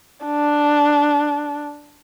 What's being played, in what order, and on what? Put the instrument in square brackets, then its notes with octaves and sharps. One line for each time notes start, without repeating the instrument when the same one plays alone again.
[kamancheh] D4